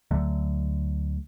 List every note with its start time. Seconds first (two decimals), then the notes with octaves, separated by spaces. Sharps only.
0.11 D2 D3 F#3 A3